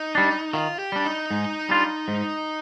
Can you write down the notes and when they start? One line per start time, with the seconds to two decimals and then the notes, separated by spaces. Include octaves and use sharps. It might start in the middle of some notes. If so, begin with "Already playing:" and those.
Already playing: D#4
0.15 G3 D4
0.53 D#3 F4
0.79 G4
0.92 G3 D4
1.05 D#4
1.31 G#2
1.69 G3 D4 F4
2.08 G#2